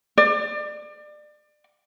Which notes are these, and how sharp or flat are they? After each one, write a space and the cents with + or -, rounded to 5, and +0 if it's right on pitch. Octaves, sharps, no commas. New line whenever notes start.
D5 +30